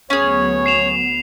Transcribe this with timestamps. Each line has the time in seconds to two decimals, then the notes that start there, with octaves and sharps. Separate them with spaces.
0.10 D2 F#3 B3 C#4 G#4 C#5
0.66 C7 E7 F7